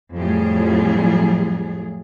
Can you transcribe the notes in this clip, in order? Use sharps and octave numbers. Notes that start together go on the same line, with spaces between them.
F2 A2 F#3 G3 G#4